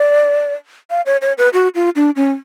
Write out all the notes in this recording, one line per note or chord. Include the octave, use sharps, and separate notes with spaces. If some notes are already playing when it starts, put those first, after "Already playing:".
Already playing: D5
F5
C#5
C#5
B4
F#4
F4
D4
C#4